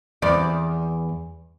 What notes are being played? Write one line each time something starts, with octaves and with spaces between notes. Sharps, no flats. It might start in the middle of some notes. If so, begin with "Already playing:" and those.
E2 D5